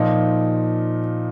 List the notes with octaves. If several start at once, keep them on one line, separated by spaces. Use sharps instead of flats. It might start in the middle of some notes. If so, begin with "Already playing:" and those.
Already playing: A#2 F3 D#4